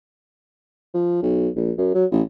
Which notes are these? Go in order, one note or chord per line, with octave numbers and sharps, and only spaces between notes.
F3
B1
A#1
F#2
F#3
A1